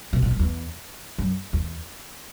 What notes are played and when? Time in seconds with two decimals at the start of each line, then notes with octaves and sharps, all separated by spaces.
0.13 B2
0.23 A#2
0.31 F#2
0.39 E2
1.18 F#2
1.53 E2